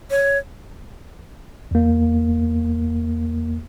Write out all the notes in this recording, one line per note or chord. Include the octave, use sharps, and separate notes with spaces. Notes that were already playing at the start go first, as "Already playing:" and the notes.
C#5
E2 A#3